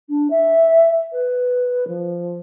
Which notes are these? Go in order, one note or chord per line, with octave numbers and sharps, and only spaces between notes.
D4
E5
B4
F3